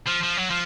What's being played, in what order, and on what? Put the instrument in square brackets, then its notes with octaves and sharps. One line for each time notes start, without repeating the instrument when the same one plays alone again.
[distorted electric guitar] F3
F3
F#3
F3